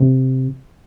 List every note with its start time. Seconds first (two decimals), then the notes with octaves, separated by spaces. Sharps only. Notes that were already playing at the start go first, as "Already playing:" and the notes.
Already playing: C3